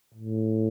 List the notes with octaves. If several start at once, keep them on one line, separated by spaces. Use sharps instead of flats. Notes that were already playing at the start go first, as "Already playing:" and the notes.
A2